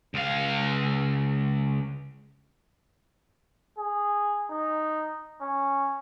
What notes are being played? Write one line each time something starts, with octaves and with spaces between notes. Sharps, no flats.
C#2 F5
G#4
D#4
C#4